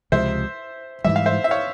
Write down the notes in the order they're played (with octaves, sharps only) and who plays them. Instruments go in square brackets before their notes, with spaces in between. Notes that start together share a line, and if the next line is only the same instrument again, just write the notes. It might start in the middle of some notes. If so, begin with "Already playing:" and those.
[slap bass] C#2 C3 F3 G#3 [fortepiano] C5 E5
[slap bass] G#2 E3 G3 [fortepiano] E5
[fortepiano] F5
C5 E5
E5
C#5 F5